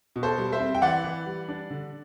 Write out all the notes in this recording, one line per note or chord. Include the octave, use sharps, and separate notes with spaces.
B2
A4 C5
G3
C5 E5
C4
G5
E3 D5 F#5
E3
G3
D4
D3